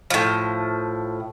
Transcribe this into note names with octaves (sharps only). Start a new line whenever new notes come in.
A2 F3